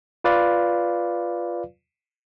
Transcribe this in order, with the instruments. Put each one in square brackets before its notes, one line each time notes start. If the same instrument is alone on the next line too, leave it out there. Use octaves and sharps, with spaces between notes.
[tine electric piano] F4 B4 D5 F5